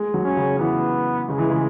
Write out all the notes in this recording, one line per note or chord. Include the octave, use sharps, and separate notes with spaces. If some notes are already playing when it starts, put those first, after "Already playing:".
Already playing: G#3
F#3
C#4
C#3
E3 B3
C#3 G#3
E3
C#3